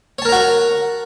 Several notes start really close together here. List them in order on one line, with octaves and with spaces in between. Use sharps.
C#5 A5 A#4 A#5 F#4